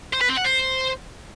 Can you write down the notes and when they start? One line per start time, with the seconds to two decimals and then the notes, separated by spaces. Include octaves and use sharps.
0.13 C5
0.21 B4
0.29 C4
0.37 F#5
0.44 C5